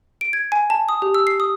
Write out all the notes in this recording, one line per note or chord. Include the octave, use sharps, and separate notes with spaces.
D7
G#6
G#5
A5
D#6
G4
E6
C7
D#6